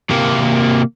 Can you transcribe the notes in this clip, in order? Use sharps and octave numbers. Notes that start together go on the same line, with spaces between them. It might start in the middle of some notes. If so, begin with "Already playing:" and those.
C3 A#3